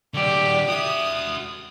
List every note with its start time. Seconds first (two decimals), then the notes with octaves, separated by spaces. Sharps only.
0.14 D3 F#3 G4 D5
0.69 F#4 E5 D#6